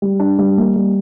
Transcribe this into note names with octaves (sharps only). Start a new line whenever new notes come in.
G3
D4
G3
A#3
G3